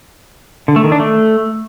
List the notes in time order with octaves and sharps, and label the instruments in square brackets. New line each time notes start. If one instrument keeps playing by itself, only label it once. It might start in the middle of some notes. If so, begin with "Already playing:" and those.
[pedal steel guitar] D3
A3
D#3
D4
A3